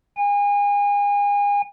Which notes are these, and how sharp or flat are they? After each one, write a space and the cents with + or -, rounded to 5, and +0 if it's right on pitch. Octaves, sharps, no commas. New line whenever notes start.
G#5 -35